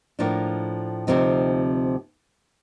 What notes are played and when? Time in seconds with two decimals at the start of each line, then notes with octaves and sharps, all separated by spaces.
0.19 A2 F3 A#3 D4
1.07 D2 C3 F3 C4 D#4